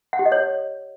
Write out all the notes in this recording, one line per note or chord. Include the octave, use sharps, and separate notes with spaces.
F#5
G4
D#5
C#5